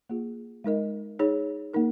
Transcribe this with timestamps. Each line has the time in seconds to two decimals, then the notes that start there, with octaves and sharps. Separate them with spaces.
0.09 A#3 F4 G#4
0.64 G#3 D#4 A#4 D#5
1.19 D#4 G#4 C#5
1.73 A#3 D#4 A#4